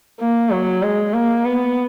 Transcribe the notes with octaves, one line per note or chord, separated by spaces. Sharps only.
A#3
F#3
G#3
A#3
B3